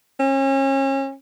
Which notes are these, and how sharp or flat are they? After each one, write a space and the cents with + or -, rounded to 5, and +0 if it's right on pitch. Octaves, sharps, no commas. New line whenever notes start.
C#4 -35